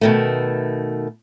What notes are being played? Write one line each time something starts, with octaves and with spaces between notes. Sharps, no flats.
B2 D#3 A3